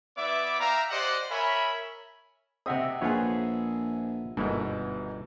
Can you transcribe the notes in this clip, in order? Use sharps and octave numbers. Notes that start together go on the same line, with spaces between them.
B3 E4 B4 D5 E5 D6
E5 F5 G5 A#5
G4 C5 D5 D#5 F#5
A#4 C#5 E5 G#5 B5
C3 C4 D#5 E5 F#5 D#6
A#1 F3 F4 G#4 B4 C#5
G1 D#2 G#2 B2 E4